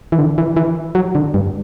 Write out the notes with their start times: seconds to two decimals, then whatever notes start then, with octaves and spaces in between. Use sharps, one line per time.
0.12 E3
0.18 D3
0.38 E3
0.57 E3
0.95 F#3
1.15 D3
1.34 G2